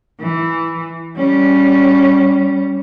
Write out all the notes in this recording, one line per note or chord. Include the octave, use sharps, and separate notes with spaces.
E3
G3 C#4